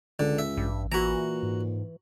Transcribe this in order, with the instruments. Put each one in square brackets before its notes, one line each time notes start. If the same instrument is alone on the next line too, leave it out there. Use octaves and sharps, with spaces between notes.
[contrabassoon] C#2 [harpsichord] D3
[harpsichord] E5
[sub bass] A1 [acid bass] G2
[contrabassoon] A#2 [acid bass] E3 [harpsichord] F#4 A#5
[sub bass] G#2